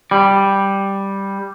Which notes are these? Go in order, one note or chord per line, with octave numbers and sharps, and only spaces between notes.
G3